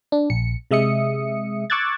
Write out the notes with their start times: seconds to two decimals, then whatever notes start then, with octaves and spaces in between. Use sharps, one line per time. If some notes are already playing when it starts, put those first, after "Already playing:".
0.12 D4
0.30 A#1 C#7
0.71 C3 G#3 E5 D#6 C#7
1.70 C#6 D6 E6 F#6 G#6 A6